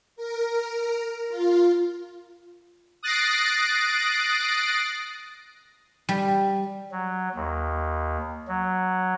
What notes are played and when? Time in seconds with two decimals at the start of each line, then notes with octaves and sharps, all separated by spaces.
0.16 A#4
1.29 F4
3.03 D#6 F#6 A6 A#6 C7 D7
6.09 G3
6.91 F#3
7.35 D#2
8.47 F#3